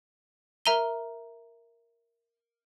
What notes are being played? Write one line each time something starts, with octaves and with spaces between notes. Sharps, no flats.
A#4 E5 A#5 D#7 G7